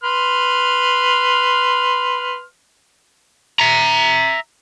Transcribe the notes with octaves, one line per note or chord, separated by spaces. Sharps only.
B4 C6 F6
E5 A#5